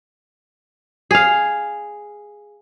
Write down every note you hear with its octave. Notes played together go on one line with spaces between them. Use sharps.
G#4 F5